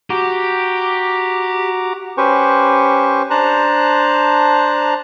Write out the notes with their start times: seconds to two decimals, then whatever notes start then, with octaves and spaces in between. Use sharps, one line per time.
0.10 F#4 G4 A#5 D6
2.17 C#4 G4 B4 C5 C#6
3.30 D4 C5 A5 A#5 F#6